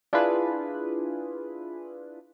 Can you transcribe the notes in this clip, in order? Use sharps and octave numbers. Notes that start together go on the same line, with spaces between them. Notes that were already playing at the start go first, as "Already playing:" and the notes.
D4 E4 F4 G#4 B4